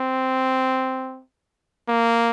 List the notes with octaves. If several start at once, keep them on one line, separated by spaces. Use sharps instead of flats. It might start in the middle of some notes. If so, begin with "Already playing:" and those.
Already playing: C4
A#3